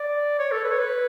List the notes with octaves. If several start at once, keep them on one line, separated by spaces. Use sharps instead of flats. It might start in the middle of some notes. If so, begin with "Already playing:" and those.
Already playing: D5
C#5
A4
B4
C#5
B4